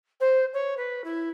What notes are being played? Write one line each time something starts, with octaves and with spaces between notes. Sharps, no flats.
C5
C#5
B4
E4